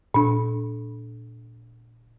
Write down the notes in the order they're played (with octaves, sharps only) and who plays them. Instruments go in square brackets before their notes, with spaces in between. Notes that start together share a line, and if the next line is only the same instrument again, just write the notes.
[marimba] A#2 D4